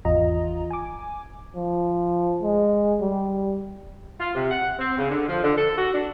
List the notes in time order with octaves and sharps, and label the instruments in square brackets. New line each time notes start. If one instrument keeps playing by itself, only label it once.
[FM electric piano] G#1 E2 F4 D#5 A#5
G#5 D6
[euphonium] F3
G#3
G3
[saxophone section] F4
C3
F#5
C4
C#3
D3
F3
D3
A4
F#4
D4